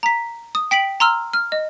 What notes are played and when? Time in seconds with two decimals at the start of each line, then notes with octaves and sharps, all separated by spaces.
0.03 A#5 B6
0.55 D#6
0.71 G5 B6 D7 F#7
1.00 A#5 C6 E6 F6
1.33 F6
1.52 D#5